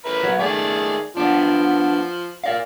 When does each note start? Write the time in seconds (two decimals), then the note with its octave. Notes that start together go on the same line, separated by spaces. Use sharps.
0.05 A#4 B4 E5
0.23 F#3 B3
0.40 D#3 A3 G#4 D5
1.17 F3 B3 D4
2.44 A#4 D5 F5